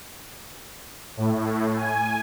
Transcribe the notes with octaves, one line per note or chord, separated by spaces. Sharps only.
A2
G#5